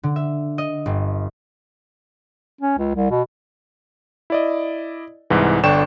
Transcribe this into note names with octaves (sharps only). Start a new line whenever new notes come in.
D3
E5
D#5
G1
C#4
C#2
C2
B2
E4 D5 D#5
C2 G#2 E3
G1 D3 D4 G5 C#6 E7